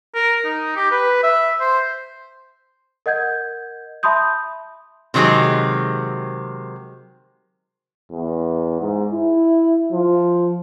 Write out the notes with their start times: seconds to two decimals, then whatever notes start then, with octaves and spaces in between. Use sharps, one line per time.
0.15 A#4
0.45 D#4
0.76 G4
0.91 B4
1.24 E5
1.61 C5
3.06 A#4 D#5 F#5 G6 G#6
4.03 E5 A5 B5 C6 D#6 G6
5.14 C3 D#3 F#3 G#3 C4
8.12 E2
8.81 G#2
9.12 E4
9.92 F3